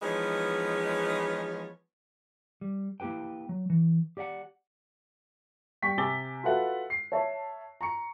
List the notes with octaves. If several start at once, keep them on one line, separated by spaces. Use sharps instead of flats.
E3 F3 G#3 B3 D#4 C#5
G3
A#3 E4 G4 B4 G5
F#3
E3
G4 D5 E5 F#5
G3 G5 C#6 B6
C3 G#5 D6 E6 A6 G7
F4 F#4 A4 B4 E5 F#5
C7
C#5 E5 A5 C#6
A#5 C#6 C#7